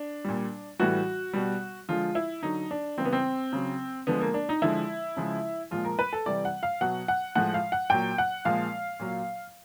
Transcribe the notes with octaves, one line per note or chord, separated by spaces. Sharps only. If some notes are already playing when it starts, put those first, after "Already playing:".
Already playing: D4
A#2 G3
A2 E3 G3 F#4
B2 G3
D3 F3 G#3 F4
E4
D3 F#3 D#4
D4
C#3 E3 G3 C4
B3
C4
C#3 F#3
D3 F3 G#3 B3
A#3
D4
D#4
D3 F3 G#3 E4
C#3 F3 G#3
A#2 F3 G#3 F4
A#4
B4
A4
C3 E3 G3 D5
F#5
F5
B2 F#3 F#5
F#5
A2 F3 G#3 F#5
F5
F#5
A#2 F#3 G5
F#5
A#2 F3 G#3 F5
A#2 F#3